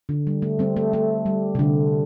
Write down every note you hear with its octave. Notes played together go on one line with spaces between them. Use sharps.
D3
G3
A3
G3 C4
A3
A3
G3
C3
D3